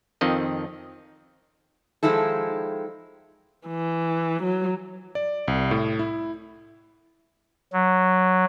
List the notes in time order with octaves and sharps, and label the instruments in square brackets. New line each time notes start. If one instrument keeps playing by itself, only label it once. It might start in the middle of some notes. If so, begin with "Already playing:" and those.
[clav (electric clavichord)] F2 D#3 C4 D#5
[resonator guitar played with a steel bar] D#3 F3 G#3 E4 A4
[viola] E3
F#3
[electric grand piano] D5
C2
A2
E4
[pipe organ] F#3